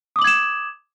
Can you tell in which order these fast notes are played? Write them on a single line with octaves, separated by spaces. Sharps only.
D#6 D6 F#7 G#6 E7